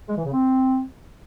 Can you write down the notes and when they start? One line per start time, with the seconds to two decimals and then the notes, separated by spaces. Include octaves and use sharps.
0.09 G#3
0.17 E3
0.25 C#3
0.33 C4